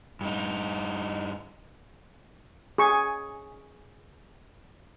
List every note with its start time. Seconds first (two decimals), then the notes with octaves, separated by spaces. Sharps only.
0.21 G2 D#4
2.78 G#4 C#6